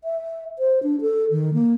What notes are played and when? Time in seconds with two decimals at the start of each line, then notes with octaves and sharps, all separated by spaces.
0.04 E5
0.59 C5
0.83 D4
1.01 A4
1.31 D#3
1.54 A#3